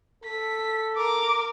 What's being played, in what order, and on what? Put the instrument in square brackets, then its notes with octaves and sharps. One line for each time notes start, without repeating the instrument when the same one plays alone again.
[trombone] A4 [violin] B6
[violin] A#4 [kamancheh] D6